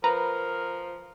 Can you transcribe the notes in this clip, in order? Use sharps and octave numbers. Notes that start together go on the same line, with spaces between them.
F3 A#4 B4 A#5